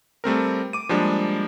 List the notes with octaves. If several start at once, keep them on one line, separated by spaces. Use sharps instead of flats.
G3 A3 C4 A#4
D6 D#7
F3 G3 G#3 A#3 D4